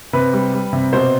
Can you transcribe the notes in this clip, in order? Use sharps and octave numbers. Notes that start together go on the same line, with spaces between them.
C3 B4
G3
G3
C3
B2 C5